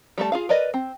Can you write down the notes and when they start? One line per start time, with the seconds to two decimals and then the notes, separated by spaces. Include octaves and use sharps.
0.18 G3 A3 A5
0.32 F4 G#4 F5
0.49 A#4 B4 D5 D#5
0.74 C4